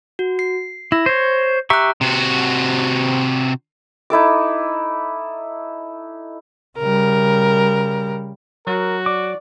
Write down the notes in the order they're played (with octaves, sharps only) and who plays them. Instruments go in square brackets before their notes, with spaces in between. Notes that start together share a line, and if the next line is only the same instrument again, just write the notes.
[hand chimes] F#4
C7
[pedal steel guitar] E4 [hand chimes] A#6
[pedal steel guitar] C5 C#5
[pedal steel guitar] G4 E5 C#6 [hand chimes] A#5 F#6
[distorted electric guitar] C3 F#4
[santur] D#4 E4 A4 D6
[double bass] C#3 G3 [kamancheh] A#4
[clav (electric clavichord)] F#3 [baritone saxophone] F#4 [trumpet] A#4
[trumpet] D5 [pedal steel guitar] D6